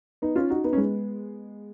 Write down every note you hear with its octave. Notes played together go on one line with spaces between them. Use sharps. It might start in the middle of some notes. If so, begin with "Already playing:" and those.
B3 D#4
C#4 F4
D#4 F#4
B3 D#4
C#4
G#3 B3